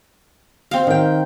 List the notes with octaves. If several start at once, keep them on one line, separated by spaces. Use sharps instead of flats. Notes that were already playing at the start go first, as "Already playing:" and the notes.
C4 F5
D#3 G5